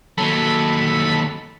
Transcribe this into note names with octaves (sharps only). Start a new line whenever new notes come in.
D#2 F#3 A4 B5